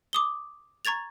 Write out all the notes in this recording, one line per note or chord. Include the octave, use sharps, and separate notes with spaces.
D6 D#6 G7
A#5 C#6 G#6 A6 F7